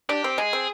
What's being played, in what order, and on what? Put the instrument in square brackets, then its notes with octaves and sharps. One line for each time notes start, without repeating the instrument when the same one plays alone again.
[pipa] D4 [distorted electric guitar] G4
[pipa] C4
[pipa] G#3 [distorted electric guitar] G#4
[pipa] C4